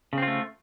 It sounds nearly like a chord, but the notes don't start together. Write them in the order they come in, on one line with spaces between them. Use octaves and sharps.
C#3 C4 F4 A3